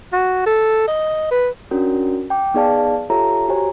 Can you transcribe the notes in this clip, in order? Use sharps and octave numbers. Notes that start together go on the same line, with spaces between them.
F#4
A4
D#5
B4
C#4 D4 F#4 A#4
G5 D6
B3 D#4 G#4 D5 F5 A5
F4 G4 A4 C#5 E5 A#5
F#4 G4 C5 C#5 G#5 A#5